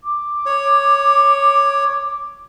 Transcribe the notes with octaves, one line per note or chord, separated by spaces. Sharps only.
D6
C#5